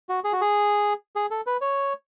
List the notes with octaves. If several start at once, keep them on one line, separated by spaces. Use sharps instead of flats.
F#4
G#4
F#4
G#4
G#4
A4
B4
C#5